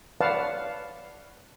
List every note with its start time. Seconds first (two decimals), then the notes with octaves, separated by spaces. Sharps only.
0.21 B4 C#5 D5 F5 F#5 A5